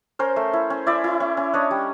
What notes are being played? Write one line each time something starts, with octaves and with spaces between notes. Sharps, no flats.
C#4 A#4 C5
A3
E4
C#4
E4 D5 E5
E4
C#4
C#4
D4 C#5 D#5
G3